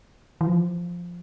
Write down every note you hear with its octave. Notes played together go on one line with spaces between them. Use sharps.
E3
F3